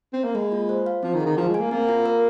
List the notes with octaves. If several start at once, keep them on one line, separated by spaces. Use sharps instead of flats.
C4
A#3
G#3 A#3
F4
C5
F5
F3 C4
D#3
G#4
D#3
F3 F5
G#3
G#5
A#3
A#3 C4
F4
A#4